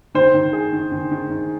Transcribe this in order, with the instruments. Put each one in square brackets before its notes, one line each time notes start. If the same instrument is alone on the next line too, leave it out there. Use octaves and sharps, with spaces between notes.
[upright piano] D#3 [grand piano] C5
[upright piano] D#3
G#4
D#3
D#3
D#3
D#3